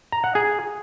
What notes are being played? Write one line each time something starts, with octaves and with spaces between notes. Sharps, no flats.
A#5
F#5
G#4